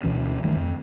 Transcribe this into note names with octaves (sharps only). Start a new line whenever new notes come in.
D2 B2 E3 C#4
D1 G2 D#3 A3
F2